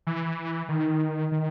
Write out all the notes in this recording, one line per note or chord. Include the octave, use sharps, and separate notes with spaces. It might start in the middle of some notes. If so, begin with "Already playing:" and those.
E3
D#3
D#3